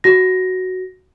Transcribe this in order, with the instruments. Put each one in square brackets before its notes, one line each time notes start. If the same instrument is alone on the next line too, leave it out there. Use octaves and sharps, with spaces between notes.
[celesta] F#4 A#6